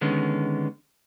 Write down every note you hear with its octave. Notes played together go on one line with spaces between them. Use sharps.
D3 D#3 G#3 B3 C#4